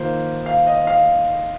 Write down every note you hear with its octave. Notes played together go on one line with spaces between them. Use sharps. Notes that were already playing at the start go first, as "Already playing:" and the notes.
Already playing: D#3 A#3 F4 C5
F5
D#5
F5